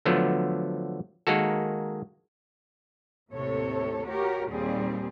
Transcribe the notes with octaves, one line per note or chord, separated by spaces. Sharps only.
D3 F3 F#3 A3 B3
D#3 G#3 A#3 F#4 A4
D#2 A2 C3 A4 C#5
F#4 G4 A#4 C#5
D#2 A#2 G3 C4 G#4